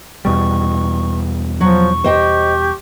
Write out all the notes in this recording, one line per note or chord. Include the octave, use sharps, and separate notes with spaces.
E2 B2 G3 C#6
F3 F#3 C#6
G4 C5 D#5 G5